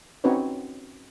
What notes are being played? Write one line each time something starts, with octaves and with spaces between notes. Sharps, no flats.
C4 C#4 D#4 F#4 B4 C#5